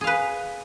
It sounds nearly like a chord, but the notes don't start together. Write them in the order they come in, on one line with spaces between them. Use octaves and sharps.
G#4 F5 B4